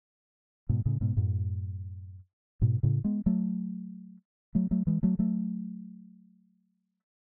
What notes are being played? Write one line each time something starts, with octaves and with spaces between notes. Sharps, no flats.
G#2 B2
A2 C#3
G#2 B2
F#2 A2
G#2 B2
A2 C#3
G#3 B3
F#3 A3
F#3 A3
F#3 A3
E3 G#3
F#3 A3
F#3 A3